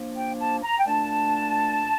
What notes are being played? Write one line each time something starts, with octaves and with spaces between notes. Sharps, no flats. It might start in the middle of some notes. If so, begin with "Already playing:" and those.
Already playing: F3 A#3 D4
G5
A5
A#5
G5
A#2 A3 D4 A5